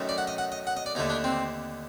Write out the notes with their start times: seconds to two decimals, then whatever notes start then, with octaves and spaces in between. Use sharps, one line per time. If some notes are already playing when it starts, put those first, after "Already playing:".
Already playing: F#2 D#3 A3
0.09 D5
0.18 F#5
0.27 D#5
0.38 F#5
0.52 D#5
0.67 F#5
0.77 D#5
0.86 D5
0.95 D#2 D3 A3 D#4
1.10 D4
1.24 C4